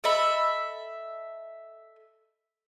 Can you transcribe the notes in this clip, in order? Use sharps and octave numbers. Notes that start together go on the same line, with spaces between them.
A4 D#5 E5 B5